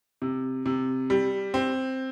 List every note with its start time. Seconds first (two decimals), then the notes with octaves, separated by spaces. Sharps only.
0.22 C3
0.66 C3
1.10 G3
1.54 C4